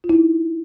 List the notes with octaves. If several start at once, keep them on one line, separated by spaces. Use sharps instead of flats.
F4
E4
D#4